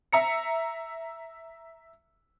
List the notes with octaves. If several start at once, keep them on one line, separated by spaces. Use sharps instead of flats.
E5 A#5 C#7